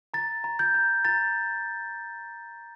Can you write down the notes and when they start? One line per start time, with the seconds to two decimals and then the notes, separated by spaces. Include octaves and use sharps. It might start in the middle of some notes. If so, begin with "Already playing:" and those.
0.14 A#5 A6
0.44 A#5
0.59 G6
0.74 A#5
1.05 A#5 A6